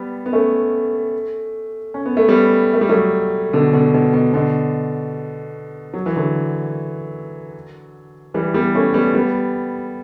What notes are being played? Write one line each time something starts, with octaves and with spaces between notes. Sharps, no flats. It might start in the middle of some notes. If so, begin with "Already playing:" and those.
Already playing: G3 B3
B3
A3 C#4
C#4
B3
A3
G3 B3
A3
G3
F#3 A3
B2 D3
B2 D3
B2
B2
B2 D3
F#3
E3
D3 F#3
E3 G3
G3 B3
A3 C#4
G3 B3
G3 B3